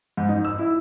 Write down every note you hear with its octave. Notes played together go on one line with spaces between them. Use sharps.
G#2
D#4
E6
E4